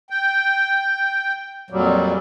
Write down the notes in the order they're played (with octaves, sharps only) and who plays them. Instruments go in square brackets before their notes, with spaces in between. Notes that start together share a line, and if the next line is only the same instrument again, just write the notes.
[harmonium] G5
F2 A#2 F#3 G3